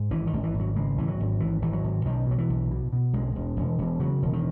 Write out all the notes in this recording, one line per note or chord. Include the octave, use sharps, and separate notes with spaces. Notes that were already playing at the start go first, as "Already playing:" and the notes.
Already playing: G#2
G#1 E3
D#3
G#1
E3
G#1
F#3
C#3 G#3
G#1 E3
F#3
G#1
G#1 E3
G#1 E3
F#3
G#1
B1 D#3
B2 F#3
E3
B1
B2
B2
B1 G#3
E1
E1
E1
C#3 F#3
E1
D#3